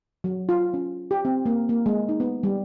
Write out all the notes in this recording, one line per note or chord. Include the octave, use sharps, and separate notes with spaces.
F#3
F4
C#4
G4
C4
A#3
A#3
G#3
D#4
B3
G3